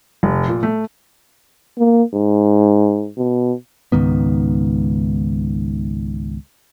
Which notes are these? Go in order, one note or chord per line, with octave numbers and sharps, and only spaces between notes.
F1
A#2
A3
A#3
G#2
B2
C#2 G#2 D#3 B3